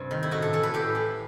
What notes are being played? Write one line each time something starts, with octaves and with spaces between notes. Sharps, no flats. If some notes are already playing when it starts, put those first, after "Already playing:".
Already playing: G2 C3 C4
D#3
E4
A2 F#4
A4
E3 A4
B4
A2 G4
E3